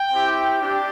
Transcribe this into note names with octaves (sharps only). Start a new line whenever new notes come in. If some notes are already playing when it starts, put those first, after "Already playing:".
Already playing: G5
C4 E4 G4
D4 G4